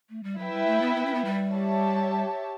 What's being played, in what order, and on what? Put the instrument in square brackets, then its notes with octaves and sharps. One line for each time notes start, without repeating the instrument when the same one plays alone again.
[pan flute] A3
G3
[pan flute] F#3 [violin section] E4 B4 E5 G5
[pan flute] G3
A3
B3
B3
C#4
B3
G3
[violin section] G4 C#5 E5 A5